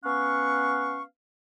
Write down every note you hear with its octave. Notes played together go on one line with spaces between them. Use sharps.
B3 C#4 F5 F#5 C#6